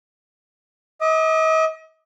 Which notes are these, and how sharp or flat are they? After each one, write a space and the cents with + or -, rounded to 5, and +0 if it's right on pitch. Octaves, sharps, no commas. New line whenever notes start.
D#5 +45 D#6 -45